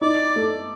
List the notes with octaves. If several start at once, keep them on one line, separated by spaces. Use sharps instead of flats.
D#4 D5
A3